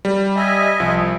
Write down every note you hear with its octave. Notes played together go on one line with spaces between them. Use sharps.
G3
D#5 E5 G#5
C2 F3